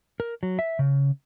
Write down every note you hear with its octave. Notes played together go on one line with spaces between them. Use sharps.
A#4
F#3
E5
C#3